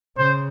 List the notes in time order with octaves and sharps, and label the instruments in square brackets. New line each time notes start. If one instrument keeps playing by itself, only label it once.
[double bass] C#3 [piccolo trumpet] C5